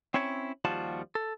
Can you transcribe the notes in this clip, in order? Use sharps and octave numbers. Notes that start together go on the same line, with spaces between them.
C4 C#4 E4 C#5
D#2 F3 G3 F4 F#4 A5
A4